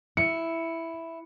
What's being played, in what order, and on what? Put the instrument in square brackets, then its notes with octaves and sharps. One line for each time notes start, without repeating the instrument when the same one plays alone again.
[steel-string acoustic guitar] E4 [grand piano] C#7